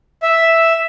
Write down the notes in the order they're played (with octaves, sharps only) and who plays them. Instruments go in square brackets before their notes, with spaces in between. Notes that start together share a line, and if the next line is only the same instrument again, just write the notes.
[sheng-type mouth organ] E5